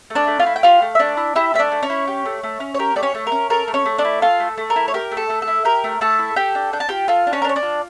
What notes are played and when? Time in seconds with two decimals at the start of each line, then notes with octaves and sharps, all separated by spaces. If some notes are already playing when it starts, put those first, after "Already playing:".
0.10 A3
0.15 D4 D5
0.27 A3
0.39 F4 F5
0.46 E4
0.56 G5
0.63 F4 G4 F5
0.82 A3
0.95 E5
0.99 A3 D4 D5
1.17 E4
1.35 E4 G4 E5
1.54 A3 E5
1.59 D4 D5
1.72 A3
1.83 C#4 C#5
1.90 E4
2.08 G4
2.25 A3
2.43 A3
2.60 C#4
2.74 C#5
2.79 G4 A#4
2.96 A3 D5
3.03 C#4 C#5
3.15 A3
3.27 A#4
3.32 C#4
3.50 A4 A#4
3.68 A3
3.74 C#4 C#5
3.86 A3
3.98 D4 D5
4.05 E4
4.21 F4 A4 F5
4.40 A3
4.58 A3
4.70 A#4
4.76 E4
4.88 C#5
4.94 G4 A#4
5.12 A3
5.17 A4
5.30 A3
5.42 A4
5.47 E4
5.65 G4 A#4
5.84 A3
6.01 A3 A4 A5
6.19 E4
6.36 G4 A4 G5
6.55 D4
6.73 D4 G5
6.80 A5
6.89 F4 G4 G5
7.08 F4 A4 F5
7.27 D4
7.33 C#4 C#5
7.42 A#4
7.44 D4
7.49 C#5
7.56 D4 D5
7.63 F4